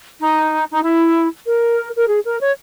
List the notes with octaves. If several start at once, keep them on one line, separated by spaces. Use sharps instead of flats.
D#4
D#4
E4
A#4
A#4
G#4
A#4
C#5